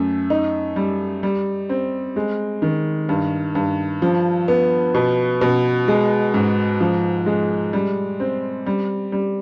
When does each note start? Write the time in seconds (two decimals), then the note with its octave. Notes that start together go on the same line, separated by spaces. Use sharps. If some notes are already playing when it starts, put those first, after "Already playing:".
Already playing: F#2 A3
0.30 D#4
0.76 G3
1.23 G3
1.69 C4
2.16 G#3
2.62 D#3
3.09 G2
3.55 G2
4.02 F3
4.48 B3
4.95 B2
5.41 B2
5.88 G#3
6.34 G#2
6.80 F3
7.26 G#3
7.73 G3
8.20 C4
8.66 G3
9.12 G3